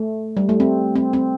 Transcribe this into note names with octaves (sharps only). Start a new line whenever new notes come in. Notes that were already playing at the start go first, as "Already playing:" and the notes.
Already playing: A3
G3
A3
C4
C4
C4